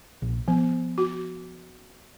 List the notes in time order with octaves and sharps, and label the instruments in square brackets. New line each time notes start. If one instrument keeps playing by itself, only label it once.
[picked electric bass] A#1
[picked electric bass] F3 [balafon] B3
[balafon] F#4